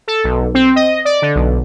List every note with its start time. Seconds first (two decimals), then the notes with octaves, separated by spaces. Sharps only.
0.08 A4
0.24 B1
0.54 C4
0.76 D#5
1.05 D5
1.22 D3
1.35 B1